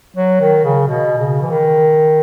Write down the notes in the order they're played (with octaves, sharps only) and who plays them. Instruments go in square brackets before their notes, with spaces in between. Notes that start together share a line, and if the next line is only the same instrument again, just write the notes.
[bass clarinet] F#3
D#3
C#3
B2
C#3
E3
D#3